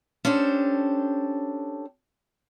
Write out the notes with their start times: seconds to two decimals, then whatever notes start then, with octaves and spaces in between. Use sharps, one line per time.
0.25 C#4 D4 G4 A4 C5